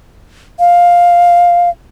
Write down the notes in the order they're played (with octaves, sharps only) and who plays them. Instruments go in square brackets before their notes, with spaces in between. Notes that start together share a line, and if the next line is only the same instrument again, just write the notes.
[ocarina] F5